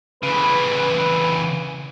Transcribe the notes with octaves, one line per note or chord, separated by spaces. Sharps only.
C#3 E3 B4